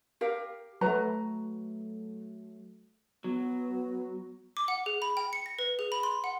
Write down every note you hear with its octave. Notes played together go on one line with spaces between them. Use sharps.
G4 A#4 F5
F#3 A3 F#4 B4 A#5
F#3 B3
D6
F#5
G#4
B5
G5
C#7
A#6
B4
G#4
B5
C6
F#5